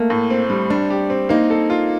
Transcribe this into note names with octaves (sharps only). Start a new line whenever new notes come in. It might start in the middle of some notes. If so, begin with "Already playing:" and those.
Already playing: A3 A#3
A2
C4
G3
G3 D4
G4
C4
A#3 D#4
A4
F4